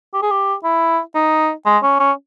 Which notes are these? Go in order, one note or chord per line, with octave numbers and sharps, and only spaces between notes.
G4
G#4
G4
E4
D#4
G#3
C#4
C#4